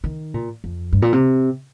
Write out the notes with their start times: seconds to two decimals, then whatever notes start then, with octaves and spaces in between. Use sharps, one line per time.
0.04 D#3
0.34 A#2
0.64 F2
0.93 G2
1.02 A#2
1.13 C3